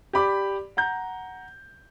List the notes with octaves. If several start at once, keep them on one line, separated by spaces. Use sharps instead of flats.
G4 D5 B5 D6
F#5 A#5 G6